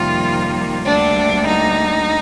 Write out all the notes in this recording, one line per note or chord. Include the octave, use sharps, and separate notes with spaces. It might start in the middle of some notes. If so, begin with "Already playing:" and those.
Already playing: F2 C3 D#3 G3 A#3 F4
D2 D3 G3 A#3 D4
D#4